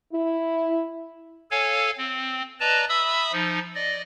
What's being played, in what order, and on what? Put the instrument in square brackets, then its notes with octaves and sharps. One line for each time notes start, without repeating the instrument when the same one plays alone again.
[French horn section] E4
[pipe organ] A4 C#5 F5 G#5
C4
B4 D5 D#5 A5 A#5
E5 B5 D#6 E6
F3 D#4
D5 D#5